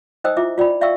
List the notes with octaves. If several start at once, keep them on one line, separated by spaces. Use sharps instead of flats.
D#4 C5 D#5 G5 D#6 E6
E4 F4 E5 D6
F4 D5 G5 B5
D5 E5 F5 G5 C#6 E6